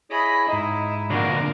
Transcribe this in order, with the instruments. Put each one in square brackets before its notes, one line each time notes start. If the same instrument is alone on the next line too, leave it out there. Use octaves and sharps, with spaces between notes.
[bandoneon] E4 G#4 C#5 [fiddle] D#5 B5
[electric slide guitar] G#2 G#4 D#5 [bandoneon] D#4 D#6 [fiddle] E4
[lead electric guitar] A#2 D3 [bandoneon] F3 B3 F#4 [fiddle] A#4 F5